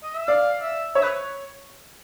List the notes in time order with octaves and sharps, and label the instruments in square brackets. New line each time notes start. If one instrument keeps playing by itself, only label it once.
[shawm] D#5
E5
[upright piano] D5 [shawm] F5
[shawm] E5
[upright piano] C#5 [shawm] E5
[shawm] B4